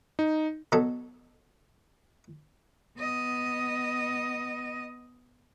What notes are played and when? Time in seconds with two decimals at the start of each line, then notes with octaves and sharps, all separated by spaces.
0.19 D#4
0.72 B2 F#3 A4
2.99 B3 D#5